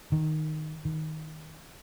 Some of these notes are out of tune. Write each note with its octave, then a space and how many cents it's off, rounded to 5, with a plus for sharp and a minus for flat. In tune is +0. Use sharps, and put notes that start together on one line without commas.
D#3 -5
D#3 +10